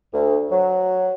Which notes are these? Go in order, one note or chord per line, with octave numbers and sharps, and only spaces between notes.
D2
F#3